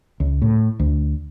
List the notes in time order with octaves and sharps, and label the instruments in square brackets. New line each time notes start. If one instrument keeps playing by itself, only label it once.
[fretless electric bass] C#2
A2
D2